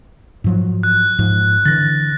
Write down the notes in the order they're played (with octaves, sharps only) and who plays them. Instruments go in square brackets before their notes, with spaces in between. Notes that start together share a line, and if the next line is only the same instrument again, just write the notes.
[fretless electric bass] G#2 F3 F#3
[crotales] F#6
[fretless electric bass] G#2 F3
[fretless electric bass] D3 E3 [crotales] A6 A#6